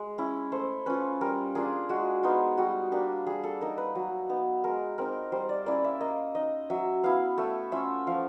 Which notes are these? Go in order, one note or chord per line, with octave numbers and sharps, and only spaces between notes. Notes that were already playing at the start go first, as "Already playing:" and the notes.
Already playing: G#3
C#4 E4
A3 C5
C#4 F4 B4
G3 A#4
A#3 D4 F4 G#4
G#3 F#4
B3 D#4 F4
G3 F#4
A#3 D4 G4
G3 G#4
A4
A#3 D#4 A#4
B4
F#3
B3 D#4
G#3 A#4
C4 D#4 A#4
G3 C5
D5
A#3 C#4 E4 D5
E5
A#3 D#5
D#4 D#5
F#3 E5
B3 E4 F5
A3 E5
C#4 F4 E5
F3 F5